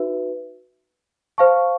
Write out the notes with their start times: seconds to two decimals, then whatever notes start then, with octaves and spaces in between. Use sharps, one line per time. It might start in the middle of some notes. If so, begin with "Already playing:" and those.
Already playing: D#4 F#4 B4 E5
1.38 C5 F5 A5 C#6